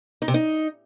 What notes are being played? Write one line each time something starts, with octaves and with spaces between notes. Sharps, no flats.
D#4
C3
D#4